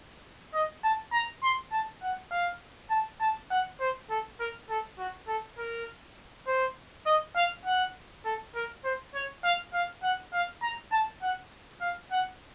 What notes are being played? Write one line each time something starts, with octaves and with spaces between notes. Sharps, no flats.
D#5
A5
A#5
C6
A5
F#5
F5
A5
A5
F#5
C5
A4
A#4
A4
F#4
A4
A#4
C5
D#5
F5
F#5
A4
A#4
C5
C#5
F5
F5
F#5
F5
A#5
A5
F#5
F5
F#5